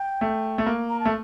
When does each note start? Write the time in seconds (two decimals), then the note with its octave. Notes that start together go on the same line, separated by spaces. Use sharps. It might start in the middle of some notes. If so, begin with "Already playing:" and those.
Already playing: G5
0.21 A3
0.58 A3
0.66 A#3
0.89 A#5
1.00 A5
1.05 A3